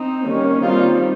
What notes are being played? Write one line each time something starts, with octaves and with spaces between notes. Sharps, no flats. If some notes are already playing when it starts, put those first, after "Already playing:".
Already playing: C4 D#4
D#3 G3 A#3 C#4
D#3 G3 C4 D#4 F4